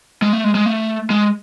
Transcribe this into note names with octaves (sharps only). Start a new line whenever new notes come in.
G#3
A3
G#3
G#3
A3
G#3